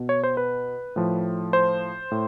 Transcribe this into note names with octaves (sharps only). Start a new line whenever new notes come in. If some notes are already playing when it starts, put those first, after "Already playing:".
Already playing: B2
C#5
C5
B4
A2 F3
C5
A2